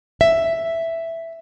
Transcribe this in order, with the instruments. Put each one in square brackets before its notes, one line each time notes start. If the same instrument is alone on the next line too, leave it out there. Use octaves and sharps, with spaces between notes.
[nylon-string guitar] E5